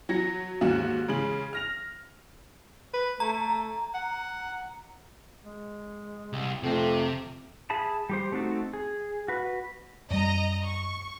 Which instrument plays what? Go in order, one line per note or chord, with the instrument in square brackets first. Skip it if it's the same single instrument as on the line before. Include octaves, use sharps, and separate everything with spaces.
[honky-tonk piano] F#3 A#6 C#7
D#2 G#2 F#4 E7
C#3 G#3 F#7
F6 A#6 F7
[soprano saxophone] B4
[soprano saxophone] A3 [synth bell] A#5
[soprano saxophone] F#5
[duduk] G#3
[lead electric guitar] C2
[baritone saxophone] F2 [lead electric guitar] C3 [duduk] A3
[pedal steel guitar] G#4 E5 A5 B5
G3 G4 C5
A3 C4 D#4 F#4 A4
G#4
F#4 B4
[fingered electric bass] F#2 G3 [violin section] D#5 A#5
[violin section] C#6